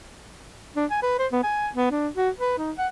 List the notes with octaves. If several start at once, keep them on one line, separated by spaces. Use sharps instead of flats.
D4
G#5
B4
C5
B3
G#5
B3
D4
F#4
B4
D#4
F#5